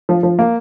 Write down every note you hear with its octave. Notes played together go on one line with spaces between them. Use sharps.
F3
F3
A#3